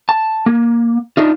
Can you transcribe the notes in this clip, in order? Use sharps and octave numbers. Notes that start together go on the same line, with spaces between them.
A5
A#3
D4 D#4 F4